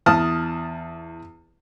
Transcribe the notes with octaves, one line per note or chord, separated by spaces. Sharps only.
E2 A5 D#6 F6